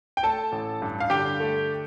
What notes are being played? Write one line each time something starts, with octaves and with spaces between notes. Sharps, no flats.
G5
A3 A4 A5
A1
G2
F5
D3 G4 G5
A3